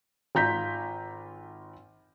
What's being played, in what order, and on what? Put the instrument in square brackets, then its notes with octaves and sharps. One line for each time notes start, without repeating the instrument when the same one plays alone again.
[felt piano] G#1 F4 A#5 G6 B6